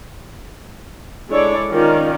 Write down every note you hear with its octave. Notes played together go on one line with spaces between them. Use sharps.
G#3 D4 E4 A4 C#5 D5
D#3 C#4 F4 A#4 D5